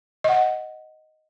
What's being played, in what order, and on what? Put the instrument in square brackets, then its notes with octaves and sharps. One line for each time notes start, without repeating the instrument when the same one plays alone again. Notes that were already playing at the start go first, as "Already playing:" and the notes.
[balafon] D#5 F#5